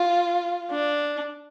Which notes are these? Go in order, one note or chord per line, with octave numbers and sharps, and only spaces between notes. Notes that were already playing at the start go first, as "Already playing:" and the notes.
Already playing: F4
D4